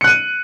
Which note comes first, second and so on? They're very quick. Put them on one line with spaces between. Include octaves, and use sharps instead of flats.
C#7 F#6 D#7